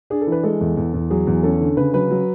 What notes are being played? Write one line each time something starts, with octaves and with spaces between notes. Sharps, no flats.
D4 G#4
A4
E3
B4
G#3 A4
E2
E2
E2
F#3 G#4
E2
C#4 A4
D3
C#3 B4
F#3 B4
F#3